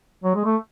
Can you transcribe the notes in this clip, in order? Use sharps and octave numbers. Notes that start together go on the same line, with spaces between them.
F#3
G#3
A3